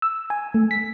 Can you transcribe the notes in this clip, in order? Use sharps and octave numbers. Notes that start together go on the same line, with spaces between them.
E6
G#5
A3
B6